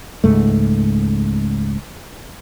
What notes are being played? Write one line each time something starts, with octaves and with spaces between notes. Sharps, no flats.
C#2 G#2 A3